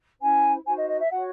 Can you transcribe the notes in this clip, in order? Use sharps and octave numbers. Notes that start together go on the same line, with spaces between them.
C#4 E4 C5 G#5
D#4 F#4 C5 G#5
D#5
D#5
E5
F#4 C#5 F#5